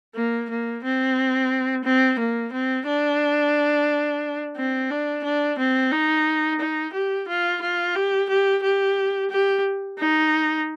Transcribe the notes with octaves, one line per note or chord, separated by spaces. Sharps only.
A#3
A#3
C4
C4
A#3
C4
D4
C4
D4
D4
C4
D#4
D#4
G4
F4
F4
G4
G4
G4
G4
D#4